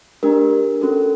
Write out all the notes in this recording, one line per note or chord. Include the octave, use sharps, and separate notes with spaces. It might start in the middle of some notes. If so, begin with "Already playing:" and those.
A3 D4 G4 A#4
C#4 F#4 A4